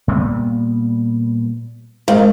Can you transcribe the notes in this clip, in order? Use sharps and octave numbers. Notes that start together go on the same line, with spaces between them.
A#2 G3 B3
G#2 A#4 F5